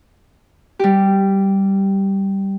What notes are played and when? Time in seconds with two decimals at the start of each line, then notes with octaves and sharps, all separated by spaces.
0.79 G3 G4